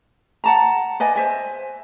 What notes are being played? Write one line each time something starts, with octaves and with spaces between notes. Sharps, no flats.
F#5 A5 A#5
B4 D5 D#5 G#5
C5 E5 G#5